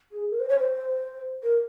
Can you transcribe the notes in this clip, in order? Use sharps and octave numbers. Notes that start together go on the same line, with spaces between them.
G#4
A#4
C5
C#5
C5
A#4